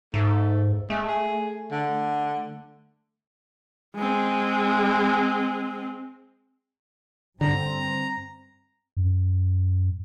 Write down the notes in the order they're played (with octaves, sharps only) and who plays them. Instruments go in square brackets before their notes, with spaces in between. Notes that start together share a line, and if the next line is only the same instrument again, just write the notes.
[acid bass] G#2 [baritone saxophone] A3
[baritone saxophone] G#3 [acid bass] A3
[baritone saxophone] G#4
D3
[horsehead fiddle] G#3 C4
[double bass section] G2 C4 [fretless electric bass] D3 [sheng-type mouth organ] A#5
[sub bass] F#2